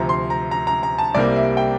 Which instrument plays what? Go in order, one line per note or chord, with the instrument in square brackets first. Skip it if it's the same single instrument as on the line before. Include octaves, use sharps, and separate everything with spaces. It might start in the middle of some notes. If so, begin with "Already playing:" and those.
Already playing: [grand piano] D2 C3 F3 A#5
C6
A#5
A#5
A#5
A#5
A5
C2 C3 G3 A#3 D5
E5
G5